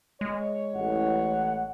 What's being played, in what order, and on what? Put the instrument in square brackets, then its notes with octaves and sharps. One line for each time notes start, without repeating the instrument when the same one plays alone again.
[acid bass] G#3 [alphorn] C#5
[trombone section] A1 [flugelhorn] F#5